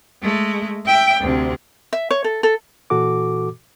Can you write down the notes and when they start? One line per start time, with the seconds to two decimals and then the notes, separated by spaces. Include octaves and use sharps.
0.22 G#3 A3
0.86 E5 G5
1.20 D2 C3
1.93 E5
2.11 C#5
2.24 A4
2.43 A4
2.90 A#2 E3 F#4 A4 D6